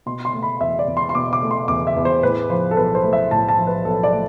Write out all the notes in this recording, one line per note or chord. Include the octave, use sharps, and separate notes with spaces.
B2 C6
C6
A3
B5
E2 E5
D5
E2
C6
C6
B2 D6
D6
A3
C6
E2 D6
E5
E2
C5
A2 B4
F3 C5
A4
B1 B4
C5
A3
E5
A2 A5
A5
F3
B4
B1 A4
D5
A3